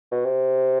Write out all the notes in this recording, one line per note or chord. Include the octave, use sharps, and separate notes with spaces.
B2
C3